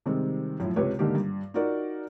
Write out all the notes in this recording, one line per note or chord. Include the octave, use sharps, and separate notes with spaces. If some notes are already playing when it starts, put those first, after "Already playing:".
C3 D#3 G3 G#3 C4
F#2 A2 F3 E4
C#2 C3 G4 B4 C#5
G#2 D3 D#3 A#3 D#4 G4
G2
D#4 F4 F#4 A#4 D5